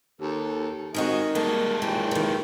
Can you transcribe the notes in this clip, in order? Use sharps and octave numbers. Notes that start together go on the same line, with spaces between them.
D#2 A4
D#3 G#3 C4 F#4 D#5
G3 G#3 A#3 A4
D#2 A#2 E3 G5
D#3 E3